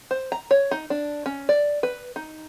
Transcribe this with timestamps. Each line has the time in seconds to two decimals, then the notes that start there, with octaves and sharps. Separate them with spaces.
0.11 C5
0.32 A#5
0.51 C#5
0.71 D#4
0.90 D4
1.26 C#4
1.49 D5
1.83 B4
2.16 D#4